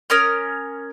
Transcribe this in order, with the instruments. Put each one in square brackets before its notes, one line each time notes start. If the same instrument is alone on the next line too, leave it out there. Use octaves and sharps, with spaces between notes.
[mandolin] C#4 A#4 D#6 F6